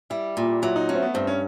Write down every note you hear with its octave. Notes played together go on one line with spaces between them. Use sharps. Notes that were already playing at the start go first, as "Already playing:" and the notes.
G3 E4
A#2
F#3 E4
D#4
A3 C#4
C4
B3
G2 C4
C#4